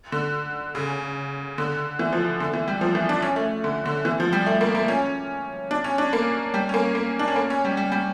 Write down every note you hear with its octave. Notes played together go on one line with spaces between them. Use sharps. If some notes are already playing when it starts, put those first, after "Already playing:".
D3
C#3
D3
E3
F3
D3
E3
G3
F3
E3
D4
C#4
A3
D3
D3
E3
F3
G3
A3
A#3
A#3
C#4
D4
C#4
D4
A#3
G3
C#4
A#3
A#3
D4
C#4
A#3
C#4
G3
G3
G3